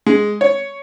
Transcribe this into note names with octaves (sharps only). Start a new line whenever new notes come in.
G#3
C#5